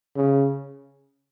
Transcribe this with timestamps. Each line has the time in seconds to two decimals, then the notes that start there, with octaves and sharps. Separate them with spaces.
0.16 C#3